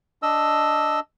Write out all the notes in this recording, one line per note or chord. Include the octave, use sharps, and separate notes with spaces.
D4 D#5 E6